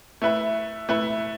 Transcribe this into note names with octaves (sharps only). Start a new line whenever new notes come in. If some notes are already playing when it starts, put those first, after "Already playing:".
A3 E4 B4 E5
A3 E4 B4 E5